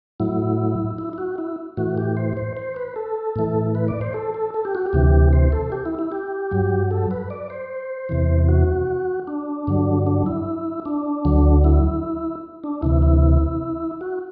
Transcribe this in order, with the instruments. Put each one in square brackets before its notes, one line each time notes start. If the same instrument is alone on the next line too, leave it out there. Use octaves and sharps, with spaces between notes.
[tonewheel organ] A2 F#3 E4
E4
E4
F#4
E4
A2 E3 F#4
G4
C5
C5
C5
B4
A4
A2 E3
B4
D5
C5
A4
A4
A4
G4
F#4
G4
D2 C3 E3
C5
A4
G4
E4
E4
G4
G2 F#3
A4
B4
D5
C5
E2 C3 E3
F#4
D4
G2 D3 F#3
D4
E4
D4
D2 D3 F#3
E4
D4
D2 C3 E3 E4
E4
F#4